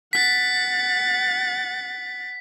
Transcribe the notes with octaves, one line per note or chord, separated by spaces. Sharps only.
F#5 A6 B6